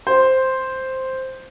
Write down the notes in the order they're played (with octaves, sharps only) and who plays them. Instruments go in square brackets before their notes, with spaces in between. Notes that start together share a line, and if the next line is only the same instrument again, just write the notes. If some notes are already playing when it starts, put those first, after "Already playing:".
[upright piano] C5